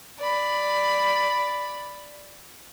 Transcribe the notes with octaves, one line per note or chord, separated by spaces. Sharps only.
D5 B5